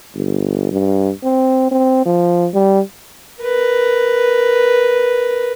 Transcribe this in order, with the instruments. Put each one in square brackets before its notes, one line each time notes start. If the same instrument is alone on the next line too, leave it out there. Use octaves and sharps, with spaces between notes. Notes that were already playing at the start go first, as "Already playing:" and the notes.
[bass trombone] G1
G2
C4
C4
F3
G3
[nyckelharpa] A#4 B4